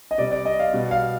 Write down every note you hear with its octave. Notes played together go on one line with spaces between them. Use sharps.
D#5
C3 G3 D5
D5
D#5
F5
B2 G3
F5